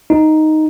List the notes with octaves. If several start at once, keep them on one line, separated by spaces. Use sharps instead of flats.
D#4